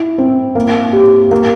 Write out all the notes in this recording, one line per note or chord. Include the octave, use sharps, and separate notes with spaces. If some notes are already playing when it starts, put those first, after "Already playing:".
Already playing: E4
C4
A#3
G4
A#3